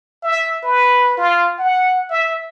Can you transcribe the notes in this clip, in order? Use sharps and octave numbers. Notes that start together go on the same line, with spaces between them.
E5
B4
F4
F#5
E5